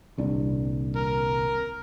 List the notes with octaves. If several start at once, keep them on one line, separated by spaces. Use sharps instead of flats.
D#1 C2 D4
A#4